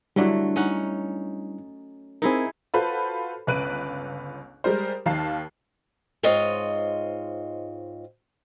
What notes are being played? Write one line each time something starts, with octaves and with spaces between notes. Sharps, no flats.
D3 F#3 G3 A3 D4 E4
C#4 D#4 F#5
C4 D#4 E4 G#4 A#4
F4 F#4 A4 B4 C5 B5
G1 C#2 B4 F#6 D7 D#7
G3 G#3 A#4 C5
D#2 D#3 F5 A5 C7
G#2 C4 F4 C#5 D#5